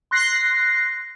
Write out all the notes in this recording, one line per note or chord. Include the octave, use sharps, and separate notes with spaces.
C6 F#6 A#6 C7